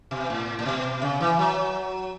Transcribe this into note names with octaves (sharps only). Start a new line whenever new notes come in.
B2
A2
A2
B2
C#3
E3
F#3